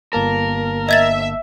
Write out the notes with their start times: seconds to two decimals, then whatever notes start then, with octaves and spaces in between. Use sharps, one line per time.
0.13 G1 A#3 A#4 A5
0.89 D#5 E5 G#6 A6